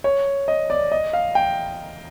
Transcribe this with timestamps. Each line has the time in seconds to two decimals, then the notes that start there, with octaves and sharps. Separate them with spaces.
0.04 C#5
0.48 D#5
0.70 D5
0.92 D#5
1.13 F5
1.35 G5